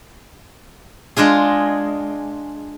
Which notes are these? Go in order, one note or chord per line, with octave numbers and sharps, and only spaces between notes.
G#3 D4 F4 G#4